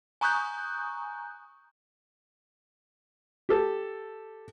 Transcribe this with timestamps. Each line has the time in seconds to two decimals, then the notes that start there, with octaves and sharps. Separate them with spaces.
0.21 G#5 A#5 C#6 D#6 F#6 G6
3.49 G4 A4